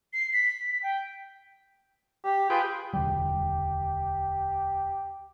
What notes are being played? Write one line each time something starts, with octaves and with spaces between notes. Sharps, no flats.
C7
B6
B6
G5
G4
F4 G#4 B4 G5
E1 D2 G3 G4